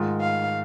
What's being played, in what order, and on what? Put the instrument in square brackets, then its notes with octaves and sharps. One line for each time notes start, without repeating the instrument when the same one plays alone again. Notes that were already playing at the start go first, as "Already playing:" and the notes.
Already playing: [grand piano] G#2 D#3 G#3 F4
[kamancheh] F5